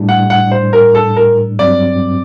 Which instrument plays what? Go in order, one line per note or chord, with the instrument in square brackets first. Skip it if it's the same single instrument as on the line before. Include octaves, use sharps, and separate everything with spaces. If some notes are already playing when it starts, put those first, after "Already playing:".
Already playing: [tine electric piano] A2 G3 D4
[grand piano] F#5
F#5
C5
A#4
A4
A#4
[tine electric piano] G2 F#3 C4 [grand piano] D5